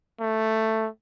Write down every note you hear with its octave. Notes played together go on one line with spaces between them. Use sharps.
A3